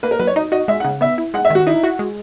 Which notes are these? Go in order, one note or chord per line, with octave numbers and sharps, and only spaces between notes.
A#3 B4
A#4
F#3 B4
C#5
D#4 D#5
F#4 D#5
G#3 E5
F#5
C#3
B3 E5
E4
G#3 F#5
E5
D#3 F#4
D#4 E4
F#4
G#3